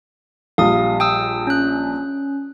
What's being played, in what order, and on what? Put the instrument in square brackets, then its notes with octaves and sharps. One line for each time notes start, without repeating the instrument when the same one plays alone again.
[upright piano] A#1 G3 [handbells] F5 D#6
[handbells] G5 D#6 E6
C#4 F#6